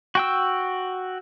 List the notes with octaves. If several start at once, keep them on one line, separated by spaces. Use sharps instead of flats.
F#4 G5 E6